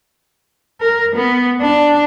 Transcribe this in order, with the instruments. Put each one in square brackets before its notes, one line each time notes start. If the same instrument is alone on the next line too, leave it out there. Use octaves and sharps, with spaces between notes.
[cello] A#4
B3
D4